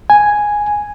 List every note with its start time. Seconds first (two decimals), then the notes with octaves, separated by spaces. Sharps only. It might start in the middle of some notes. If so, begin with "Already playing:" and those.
0.10 G#5